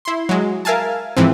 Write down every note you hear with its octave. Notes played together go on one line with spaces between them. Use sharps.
E4 C6
F#3 G#3
A#4 E5 F5 G#5 A5
G#2 E3 F3 C4